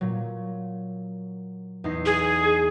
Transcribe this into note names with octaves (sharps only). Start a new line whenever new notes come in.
A#2 F#3
E2 D#4 C7
G#4